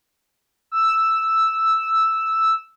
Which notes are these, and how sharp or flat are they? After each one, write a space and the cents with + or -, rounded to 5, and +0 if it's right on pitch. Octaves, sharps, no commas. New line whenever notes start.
E6 +0